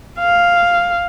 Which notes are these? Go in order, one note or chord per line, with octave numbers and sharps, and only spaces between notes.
F5